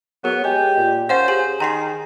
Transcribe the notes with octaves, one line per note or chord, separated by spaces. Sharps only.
F#3 B3 G#4 A#4
G#3 G4 G#5
A#2
C#4 C5 F5 F#5 A6
G4 G#4 F#7
D#3 A#5 C6 C7